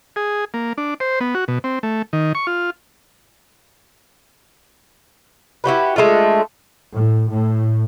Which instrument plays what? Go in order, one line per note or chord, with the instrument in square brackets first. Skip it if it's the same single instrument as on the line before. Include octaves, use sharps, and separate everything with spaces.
[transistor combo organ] G#4
A#3
D4
C5
B3
F#4
B2
C4
A3
D#3
C#6
F4
[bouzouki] E4 F#4 G4 B4
G#3 A3 D4 F4
[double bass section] A2
A2